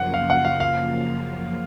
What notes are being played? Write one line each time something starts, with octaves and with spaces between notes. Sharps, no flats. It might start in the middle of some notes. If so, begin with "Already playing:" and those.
Already playing: F#2 C#3 F3 A#3 F4 F#5
F5
F#5
F5
F5